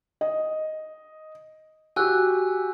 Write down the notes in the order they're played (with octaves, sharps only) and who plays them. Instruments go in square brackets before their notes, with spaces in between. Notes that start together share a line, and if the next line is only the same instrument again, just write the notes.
[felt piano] D#5
[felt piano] F#4 G4 [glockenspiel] G#5 E6 F#6